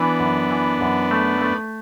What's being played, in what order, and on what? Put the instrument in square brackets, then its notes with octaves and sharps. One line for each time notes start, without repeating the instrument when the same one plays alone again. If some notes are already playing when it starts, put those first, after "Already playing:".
Already playing: [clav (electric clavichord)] E3 [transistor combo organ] B3 D4
[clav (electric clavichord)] F#2
E3
F#2
A3
A3